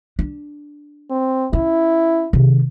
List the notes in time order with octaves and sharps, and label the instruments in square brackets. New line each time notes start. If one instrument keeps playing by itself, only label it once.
[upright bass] D4
[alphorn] C4
[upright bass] C#4 [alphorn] E4
[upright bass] C3 D#3